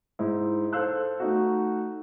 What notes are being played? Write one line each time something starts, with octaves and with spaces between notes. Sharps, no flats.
G#2 D#4 E4
A4 C5 F5 E6 F#6
A3 D#4 F#4